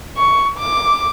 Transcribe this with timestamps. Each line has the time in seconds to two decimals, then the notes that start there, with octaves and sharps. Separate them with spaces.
0.17 C#6
0.58 D6